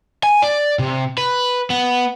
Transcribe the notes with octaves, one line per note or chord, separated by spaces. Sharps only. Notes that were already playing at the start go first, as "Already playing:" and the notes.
G#5
D5
C3
B4
B3